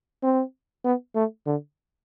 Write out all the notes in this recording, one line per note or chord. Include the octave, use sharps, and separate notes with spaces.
C4
B3
A3
D3